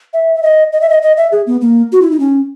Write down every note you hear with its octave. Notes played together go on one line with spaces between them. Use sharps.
E5
E5
D#5
D#5
E5
D#5
D#5
E5
G#4
B3
A#3
F#4
E4
D#4
C#4